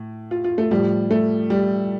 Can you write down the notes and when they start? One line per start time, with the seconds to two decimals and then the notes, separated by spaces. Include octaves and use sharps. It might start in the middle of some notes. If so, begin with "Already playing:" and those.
Already playing: A2
0.31 F4
0.44 F4
0.58 A3
0.71 A2 F3 G3
1.11 A3
1.50 G3